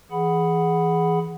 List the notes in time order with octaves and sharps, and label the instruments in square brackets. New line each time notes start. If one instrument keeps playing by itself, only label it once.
[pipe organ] E3 G#4 F#5 B5